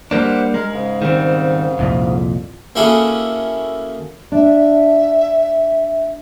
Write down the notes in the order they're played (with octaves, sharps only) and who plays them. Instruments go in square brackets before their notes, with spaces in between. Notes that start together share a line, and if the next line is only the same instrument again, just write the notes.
[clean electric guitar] G3 A#3 D4 [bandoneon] C5 F#5
[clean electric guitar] G#3 [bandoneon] A#4
[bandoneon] G#2 C#3
[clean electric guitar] D#3 G3 C4
C2 F2 A#2
[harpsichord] A#3 C#4 E4 F#4 G#4 A4
[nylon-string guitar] D4 [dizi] E5